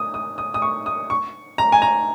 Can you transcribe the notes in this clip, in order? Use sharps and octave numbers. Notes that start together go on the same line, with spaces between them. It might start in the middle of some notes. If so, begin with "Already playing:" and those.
Already playing: D#6
D#6
D#6
D#6
C#6
D#6
C#6
A#5
G#5
A#5